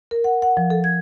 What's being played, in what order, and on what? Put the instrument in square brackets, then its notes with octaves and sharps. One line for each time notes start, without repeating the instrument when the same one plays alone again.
[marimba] A#4
F#5
F#5
F3
A4
G#6